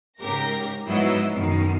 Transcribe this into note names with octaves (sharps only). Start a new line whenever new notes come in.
G#2 C#3 G4 A#4 A#6
G#2 F#3 B3 E4 D#5 E6
F#2 B2 D#3